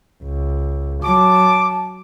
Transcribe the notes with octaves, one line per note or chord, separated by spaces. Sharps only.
C#2
F#3 A5 D6